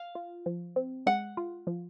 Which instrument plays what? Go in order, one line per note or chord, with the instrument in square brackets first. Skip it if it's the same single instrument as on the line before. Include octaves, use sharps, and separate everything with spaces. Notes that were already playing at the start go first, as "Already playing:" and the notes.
Already playing: [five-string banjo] F5
[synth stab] F4
F3
C4
[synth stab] G#3 [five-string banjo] F#5
[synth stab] F4
F3